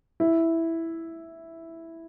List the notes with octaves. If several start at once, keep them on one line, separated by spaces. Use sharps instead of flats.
E4